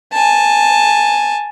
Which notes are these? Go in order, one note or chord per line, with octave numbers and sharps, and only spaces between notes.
G#5 A5